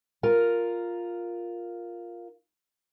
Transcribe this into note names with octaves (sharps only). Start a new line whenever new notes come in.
F4 A#4